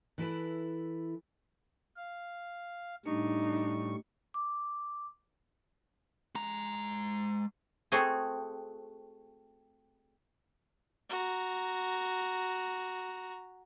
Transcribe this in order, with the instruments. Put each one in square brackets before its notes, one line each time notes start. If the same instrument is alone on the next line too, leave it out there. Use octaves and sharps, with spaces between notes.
[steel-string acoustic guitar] E3 E4 A4 B4
[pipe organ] F5
[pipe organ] A2 G3 C#6 [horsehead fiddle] D4 D#4
[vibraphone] D6
[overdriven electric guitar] G#3 A#5
[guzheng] A3 C4 F#4 G#4
[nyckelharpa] F#4 A#5